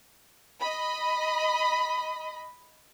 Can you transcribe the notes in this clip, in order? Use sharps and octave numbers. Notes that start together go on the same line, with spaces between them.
D#5 B5